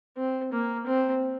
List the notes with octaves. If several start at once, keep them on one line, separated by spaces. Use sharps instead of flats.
C4
A#3
C4